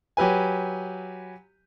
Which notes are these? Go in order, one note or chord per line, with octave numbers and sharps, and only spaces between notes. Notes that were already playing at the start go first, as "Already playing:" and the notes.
F#3 G4 B4 G#5